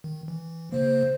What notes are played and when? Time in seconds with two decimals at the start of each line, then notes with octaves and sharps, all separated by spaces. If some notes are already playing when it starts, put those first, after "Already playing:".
0.04 D#3
0.28 E3
0.72 C#3 A#3 C5